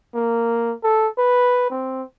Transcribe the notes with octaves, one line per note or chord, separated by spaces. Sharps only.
A#3
A4
B4
C4